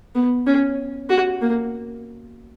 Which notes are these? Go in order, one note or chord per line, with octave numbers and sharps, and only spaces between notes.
B3
C#4
F#4
A#3